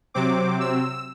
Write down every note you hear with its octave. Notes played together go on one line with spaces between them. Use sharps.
C3 F#3 C4 D6
E6